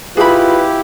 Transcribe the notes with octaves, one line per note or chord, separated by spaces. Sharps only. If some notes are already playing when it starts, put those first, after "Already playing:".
E4 F4 G4 G#4 B4 B5